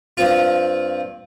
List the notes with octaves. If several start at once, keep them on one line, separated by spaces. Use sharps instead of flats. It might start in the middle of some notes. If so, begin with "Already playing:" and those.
G2 C4 F4